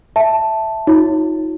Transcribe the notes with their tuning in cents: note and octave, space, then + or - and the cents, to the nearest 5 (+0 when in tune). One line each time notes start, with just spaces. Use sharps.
E5 +0 A5 +0
D#4 +30 F#4 -45 C#5 +0